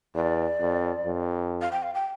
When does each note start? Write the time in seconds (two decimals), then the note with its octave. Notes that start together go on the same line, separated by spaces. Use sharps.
0.15 E2 D5
0.61 F2
1.05 F2
1.61 F5
1.72 G5
1.83 F5
1.95 G5